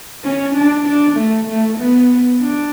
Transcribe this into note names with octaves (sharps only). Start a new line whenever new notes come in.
C#4
D4
D4
A3
A3
B3
D4